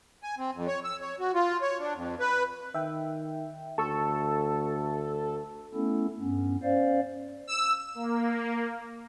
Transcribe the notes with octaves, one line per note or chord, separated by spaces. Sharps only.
G#5
C4
F2
C#5
E6
C#5
F#4
F4
C#5
D4
F2
B4
D#3 E5 G5
D2 A4 A5 C#6 E6
A3 B3 C#4 E4 A4
G2 B3 C#4
C#4 C5 D5 F5
E6
A#3